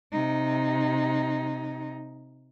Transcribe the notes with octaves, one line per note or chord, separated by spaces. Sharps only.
C3 D#4